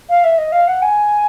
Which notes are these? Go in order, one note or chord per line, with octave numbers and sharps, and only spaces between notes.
F5
E5
D#5
F5
F#5
G#5